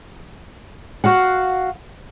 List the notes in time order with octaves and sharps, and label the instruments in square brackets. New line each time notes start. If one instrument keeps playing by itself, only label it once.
[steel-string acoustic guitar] F#4 F5 F#5